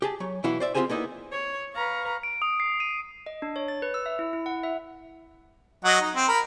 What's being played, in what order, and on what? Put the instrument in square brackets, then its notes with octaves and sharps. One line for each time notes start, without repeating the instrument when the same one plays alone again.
[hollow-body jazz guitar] G4 G#4 A5
F#3 C#5
B1 E3 E4 F#4 F5
C5 D5 E5
C4 F4 G4 G#4 C5 G#5
A#3 B3 D#4 E4
[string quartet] C#5
B4 F5 A#5 C#6
[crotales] D7
D#6
C7
D#7
[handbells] D#5
D4
C#5
A6
B4
E6
E5
E4
E4
F#5
E5
[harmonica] F#3 D#5 F#5
D#4
C4
A#4 B5